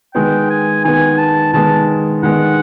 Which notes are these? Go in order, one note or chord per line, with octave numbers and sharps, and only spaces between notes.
D#3 G#3 B3 G5
G#5
D#3 G#3 B3 G#5
A5
D#3 G#3 B3 A5
D#3 G#3 B3 F#5